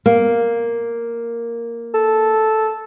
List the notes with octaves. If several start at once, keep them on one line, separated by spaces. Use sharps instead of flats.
A#3
A4